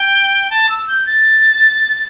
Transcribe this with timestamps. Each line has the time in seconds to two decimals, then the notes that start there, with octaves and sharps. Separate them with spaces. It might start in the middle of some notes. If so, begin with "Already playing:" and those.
Already playing: G5
0.50 A5
0.69 E6
0.88 G6
1.06 A6